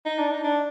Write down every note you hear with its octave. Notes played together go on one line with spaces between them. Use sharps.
D#4
D4
D#4
D4